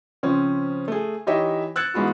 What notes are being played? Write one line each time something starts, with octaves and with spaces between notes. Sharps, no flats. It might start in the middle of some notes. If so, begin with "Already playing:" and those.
C#3 F3 C4 C#4
A3 G#4
E3 D#4 G4 C#5 D#5 E5
E6 F#6 G#6 A6 C#7 E7
G#2 E3 G#3 B3 F#4